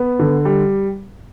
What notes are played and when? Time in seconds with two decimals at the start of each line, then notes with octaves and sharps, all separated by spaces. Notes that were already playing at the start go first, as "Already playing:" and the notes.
Already playing: B3
0.19 D3
0.45 G3